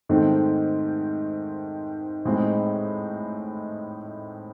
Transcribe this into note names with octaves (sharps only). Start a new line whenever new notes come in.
G#2 D#3 A3 C4
A2 G#3 C4 D#4